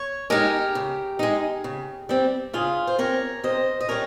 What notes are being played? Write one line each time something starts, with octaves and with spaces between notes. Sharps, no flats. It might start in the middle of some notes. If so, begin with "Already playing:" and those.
Already playing: C#5
G#3 D#4 G4 A#4
C#3
G#3 D#4
C#3
G3 C4
C#3 F4 G#4
C5
G3 C4 A#4 C#5
C3 C5 D#5
D#5
G3 C#4 A#4 C#5